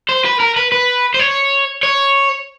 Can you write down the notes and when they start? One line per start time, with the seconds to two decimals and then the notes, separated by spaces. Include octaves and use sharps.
0.09 C5
0.25 B4
0.40 A#4
0.56 B4
0.72 B4
1.14 C5
1.19 C#5
1.83 C#5